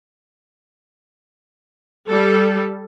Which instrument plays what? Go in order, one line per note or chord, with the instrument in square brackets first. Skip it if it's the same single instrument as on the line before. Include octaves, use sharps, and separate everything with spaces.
[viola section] G3 A4